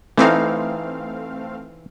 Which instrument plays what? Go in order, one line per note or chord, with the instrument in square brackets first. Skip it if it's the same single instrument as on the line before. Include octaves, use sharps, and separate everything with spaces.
[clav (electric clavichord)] E3 D#4 [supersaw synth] A3 C4 F5